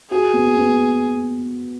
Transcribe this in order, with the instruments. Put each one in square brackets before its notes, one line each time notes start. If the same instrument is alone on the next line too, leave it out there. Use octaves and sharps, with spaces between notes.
[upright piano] F#4 [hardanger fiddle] G#4
[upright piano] B3
B3